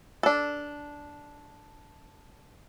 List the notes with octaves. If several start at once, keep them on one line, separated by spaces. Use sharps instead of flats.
D4 A4